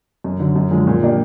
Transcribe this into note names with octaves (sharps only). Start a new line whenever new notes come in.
F#2
D3 F#3
F#2
D3 F3 G#3
A#2
F3 A#3 D4 G4